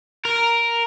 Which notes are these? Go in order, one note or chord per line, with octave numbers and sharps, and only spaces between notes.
A#4